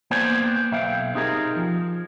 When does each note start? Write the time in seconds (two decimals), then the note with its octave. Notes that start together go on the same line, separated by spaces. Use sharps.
0.11 A#3 B3 C5 D5 G5 G#5
0.72 B1 E5 F5 G5
1.15 C4 D#4 G4 G#4 A#4
1.56 F3